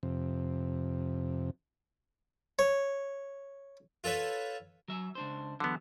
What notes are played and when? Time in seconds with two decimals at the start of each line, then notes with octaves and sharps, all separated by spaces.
0.03 F2 C3
2.59 C#5
4.04 F4 A4 B4 C#5
4.88 F#3 E5
5.15 C#2 D4 C5
5.60 E2 D3 F#3 B3